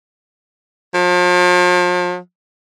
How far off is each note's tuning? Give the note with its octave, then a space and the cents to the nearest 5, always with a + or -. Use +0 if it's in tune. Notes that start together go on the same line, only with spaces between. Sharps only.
F3 +40